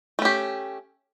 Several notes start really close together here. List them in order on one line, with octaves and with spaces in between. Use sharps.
A3 C#4 G4